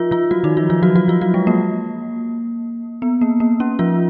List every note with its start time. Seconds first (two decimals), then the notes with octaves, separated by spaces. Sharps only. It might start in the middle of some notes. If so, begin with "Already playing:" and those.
Already playing: F3 F4
0.11 F3 F4
0.31 F#3 F#4
0.43 D#3 D#4
0.57 F3 F4
0.70 F3 F4
0.82 F#3 F#4
0.95 F#3 F#4
1.08 F3 F4
1.21 F#3 F#4
1.34 G#3
1.47 A#3
3.02 B3
3.21 A#3
3.40 A#3
3.60 C#4
3.79 F3 F4